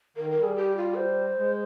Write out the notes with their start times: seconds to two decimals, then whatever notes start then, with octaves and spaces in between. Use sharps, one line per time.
0.16 D#3 A#4
0.30 A#4
0.36 G3
0.43 G#4
0.56 G4
0.77 F4
0.96 C5
1.37 G#3